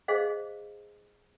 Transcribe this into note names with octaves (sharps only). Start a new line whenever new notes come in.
G#4 C5 D#5 F5